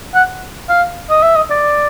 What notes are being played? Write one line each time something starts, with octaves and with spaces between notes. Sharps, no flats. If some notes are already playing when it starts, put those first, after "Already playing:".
F#5
F5
D#5
E5
D#5
D5